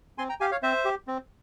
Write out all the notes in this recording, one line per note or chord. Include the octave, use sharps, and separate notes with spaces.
C4 G#5 C6
G5 A#5
G4 F5 G#5
C#5 F5
C4 C5 E5
G4
C4